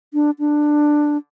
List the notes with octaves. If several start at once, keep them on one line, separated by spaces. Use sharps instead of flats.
D4
D4